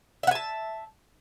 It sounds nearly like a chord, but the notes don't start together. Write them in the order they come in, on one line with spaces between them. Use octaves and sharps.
E5 F#5 G#5 A5